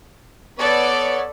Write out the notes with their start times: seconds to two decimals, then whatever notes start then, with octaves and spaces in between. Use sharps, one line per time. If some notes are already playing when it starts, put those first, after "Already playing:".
0.59 B3 A4 B4 C#5 D5